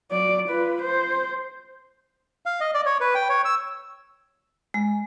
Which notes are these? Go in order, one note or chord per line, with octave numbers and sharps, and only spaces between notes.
F#3 D5
F4 B4
C5
F5
D#5
D5
C#5
B4
G5
C#5
E6
G#3